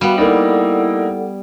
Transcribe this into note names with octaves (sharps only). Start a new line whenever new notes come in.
G3 B3 F#4 F5
A#3 D#4 E4 A4 D5 F#5